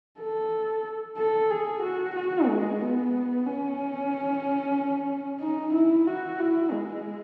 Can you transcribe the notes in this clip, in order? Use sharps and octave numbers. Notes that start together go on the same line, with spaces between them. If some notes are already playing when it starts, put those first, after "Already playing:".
A4
A4
G#4
F#4
F#4
G#3
B3
C#4
D#4
E4
F#4
E4
G#3